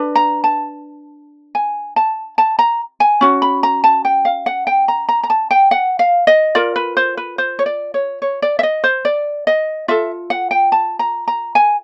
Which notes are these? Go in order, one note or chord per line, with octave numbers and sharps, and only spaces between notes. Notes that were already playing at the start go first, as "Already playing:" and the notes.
Already playing: D4 B4
A#5
A5
G#5
A5
A5
A#5
G#5
C#4 F#4
B5
A#5
A5
G5
F5
F#5
G5
A#5
A#5
A#5
A5
G5
F#5
F5
D#5
F4 A#4 D5
B4
C5
B4
C5
C#5
D5
C#5
C#5
D5
E5
D#5
C5
D5
D#5
F4 A4 E5
F#5
G5
A5
A#5
A#5
G#5